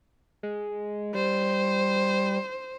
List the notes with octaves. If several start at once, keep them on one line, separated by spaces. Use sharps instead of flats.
G#3
G3 C5